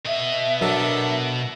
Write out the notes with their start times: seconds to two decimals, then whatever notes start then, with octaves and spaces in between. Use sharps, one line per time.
0.06 B2 D#5 E5
0.61 F#3 D4 A4 A#4